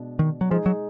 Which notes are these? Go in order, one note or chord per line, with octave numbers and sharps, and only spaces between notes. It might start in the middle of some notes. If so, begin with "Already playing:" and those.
Already playing: B2 G#3 D4
D#3
F#3
F3 G#3 D#4 G#4
F#3